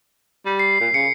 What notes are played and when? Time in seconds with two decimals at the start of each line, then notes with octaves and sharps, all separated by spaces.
0.45 G3
0.59 C7
0.80 A#2
0.94 C#3 C#7